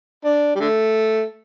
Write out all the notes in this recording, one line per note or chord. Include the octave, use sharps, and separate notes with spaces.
D4
G3
D3 A3